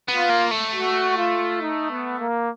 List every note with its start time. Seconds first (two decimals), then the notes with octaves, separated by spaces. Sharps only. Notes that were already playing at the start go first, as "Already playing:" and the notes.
0.08 B3
0.15 F4
0.30 A#3
0.51 A3
0.73 F#4
1.17 F4
1.60 D#4
1.89 B3
2.18 A#3